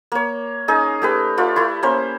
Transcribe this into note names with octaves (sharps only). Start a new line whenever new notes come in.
A#3 C#5
C#4 D#4 G#4 D#5
A3 G4 B4
A3 F4 D5
A3 E4
A#3 C#4 C5